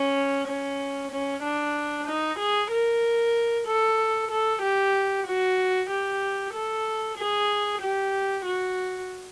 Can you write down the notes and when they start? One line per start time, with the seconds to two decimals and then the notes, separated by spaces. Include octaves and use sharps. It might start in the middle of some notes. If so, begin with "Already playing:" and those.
Already playing: C#4
0.47 C#4
1.12 C#4
1.43 D4
2.07 D#4
2.39 G#4
2.71 A#4
3.67 A4
4.31 A4
4.62 G4
5.27 F#4
5.90 G4
6.54 A4
7.18 G#4
7.82 G4
8.45 F#4